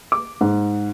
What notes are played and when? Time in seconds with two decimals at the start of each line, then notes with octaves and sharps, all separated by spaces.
0.12 D6
0.41 G#2